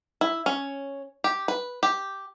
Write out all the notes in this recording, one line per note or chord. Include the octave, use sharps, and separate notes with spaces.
E4
C#4
G4
B4
G4